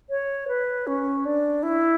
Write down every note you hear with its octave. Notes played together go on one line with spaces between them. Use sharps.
C#5
B4
C#4
D4
E4